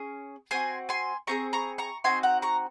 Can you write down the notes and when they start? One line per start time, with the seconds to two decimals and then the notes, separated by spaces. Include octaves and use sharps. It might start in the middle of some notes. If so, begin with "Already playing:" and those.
Already playing: C#4 G#4
0.51 C4 F#4 G#5 C6
0.89 G#5 C6
1.27 C4 F4 G#4 A#5 C#6
1.53 A#5 C#6
1.78 A#5 C#6
2.04 C4 D#4 F#4 G#5 C6
2.23 F#5 A#5
2.42 A#5 C#6